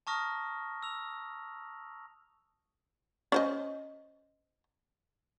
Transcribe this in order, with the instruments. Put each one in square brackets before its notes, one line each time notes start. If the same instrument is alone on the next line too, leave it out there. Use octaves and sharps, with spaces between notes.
[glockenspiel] A5 A#5 C#6 D#6 F6 A#6
E6 F7
[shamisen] C#4 C5 D#5